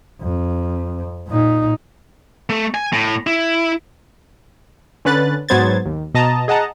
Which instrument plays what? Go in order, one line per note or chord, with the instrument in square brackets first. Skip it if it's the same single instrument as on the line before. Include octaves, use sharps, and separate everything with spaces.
[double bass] F2
A#2 D#4
[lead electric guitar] A3
G#5
A2
E4
[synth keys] D3 C#4 B4 F#6 A6
G#2 F#3 B3 C5 G#6 A6
D#2
B2 D#5 A5 A#5
G#4 D#5 F#5 A5 A#5